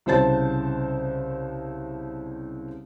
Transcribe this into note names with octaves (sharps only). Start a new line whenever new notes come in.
C2 C#3 C5 A5 A6